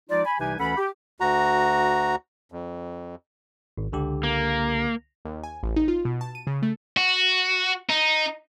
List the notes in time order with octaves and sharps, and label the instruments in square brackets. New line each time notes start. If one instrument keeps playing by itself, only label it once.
[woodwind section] F3 G#3 D#4 F4 D5
G#5 B5
C2 C3 E3 D#4 B4 G#5
D2 E3 C#4 A4 F#5 B5
G4
[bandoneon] D2 F#4 A#5
F2
[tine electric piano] G#1
C#2 D3 G4
[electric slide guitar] A#3
[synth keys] D#2
G#5
A1
D#4
F4
B2
A5
D#7
C#3
A3
[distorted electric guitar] F#4
D#4